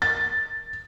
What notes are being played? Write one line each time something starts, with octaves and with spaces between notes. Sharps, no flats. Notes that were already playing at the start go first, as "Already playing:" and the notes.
A6